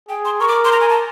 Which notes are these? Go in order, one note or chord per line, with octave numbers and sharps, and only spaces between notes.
G#4 G5
C6
A#4 C#6
D6
C6
A#5
G#5
A5